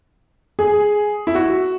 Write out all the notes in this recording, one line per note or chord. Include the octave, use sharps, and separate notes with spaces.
G#4
E4
F#4